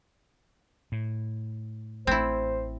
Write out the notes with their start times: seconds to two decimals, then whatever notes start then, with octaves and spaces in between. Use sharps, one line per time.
0.92 A2
2.07 A1 A3 C4 E4 C5